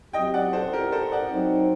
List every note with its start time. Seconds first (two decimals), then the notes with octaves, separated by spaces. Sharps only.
0.13 F#3 C4 G4 D#5 G5
0.34 D5 F#5
0.53 A4 C5
0.73 G4 A#4
0.92 A4 C5
1.12 D5 F#5
1.32 F#3 C4 D#4